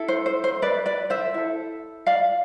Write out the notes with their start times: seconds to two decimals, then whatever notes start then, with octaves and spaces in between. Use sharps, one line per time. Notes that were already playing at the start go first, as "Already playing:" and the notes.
Already playing: E4 A4
0.08 C5
0.26 C5
0.44 C5
0.62 B4 D5
0.86 B4 D5
1.10 C5 E5
1.34 E4 A4
2.06 D5 F5